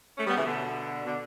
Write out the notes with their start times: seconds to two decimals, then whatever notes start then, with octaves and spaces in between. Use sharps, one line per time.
0.16 A3 C#4
0.27 G3 B3
0.36 C#3 E3
0.45 B2 D3
1.05 B2 D3